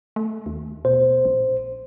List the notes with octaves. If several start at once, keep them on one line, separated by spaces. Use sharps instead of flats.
A3
D#2
B2 C5
A#1